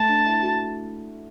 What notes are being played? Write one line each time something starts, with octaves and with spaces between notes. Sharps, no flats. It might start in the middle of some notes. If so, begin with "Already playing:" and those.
Already playing: A3 A5
D4
E4
F#4